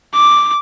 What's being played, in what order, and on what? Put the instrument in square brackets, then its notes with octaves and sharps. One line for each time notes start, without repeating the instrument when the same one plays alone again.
[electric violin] D6